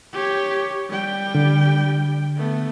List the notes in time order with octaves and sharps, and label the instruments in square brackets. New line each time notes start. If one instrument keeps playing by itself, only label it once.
[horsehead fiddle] G4 C#5
G3 G5
[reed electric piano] D3
[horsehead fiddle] A3 B3